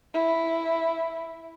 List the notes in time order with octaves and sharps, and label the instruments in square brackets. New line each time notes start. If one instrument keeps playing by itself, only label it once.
[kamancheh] E4